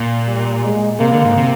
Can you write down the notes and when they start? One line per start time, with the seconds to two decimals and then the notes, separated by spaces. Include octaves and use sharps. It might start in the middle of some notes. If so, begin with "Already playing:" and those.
Already playing: A#2
0.27 G3
0.64 G#3
1.00 C3 A#3
1.13 D3
1.25 G#2
1.38 C3